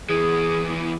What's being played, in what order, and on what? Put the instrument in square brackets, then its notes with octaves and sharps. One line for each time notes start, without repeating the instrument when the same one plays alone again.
[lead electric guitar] E2 E3 [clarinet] G#4